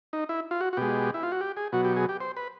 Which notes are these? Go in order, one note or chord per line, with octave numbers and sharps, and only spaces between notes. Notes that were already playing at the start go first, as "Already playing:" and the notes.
D#4
E4
F4
F#4
F#4
B2 G#3 G4
E4
F4
F#4
G4
G#4
B2 F#3 F#4
G4
G#4
G4
C5
B4